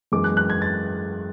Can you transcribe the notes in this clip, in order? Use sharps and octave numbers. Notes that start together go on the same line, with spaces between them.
F#2 E3 G#3 D6
F#6
F#6
G#6
A6